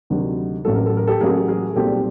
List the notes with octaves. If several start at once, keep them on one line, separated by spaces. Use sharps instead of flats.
D2 C3 D#3 F#3
A1 A2 F#3 A4
A#4
A4
A#4
G4 A4
A1 A2 F#3 G#4 A#4
G#4 A#4
B1 A#2 G3 C4 G4 A4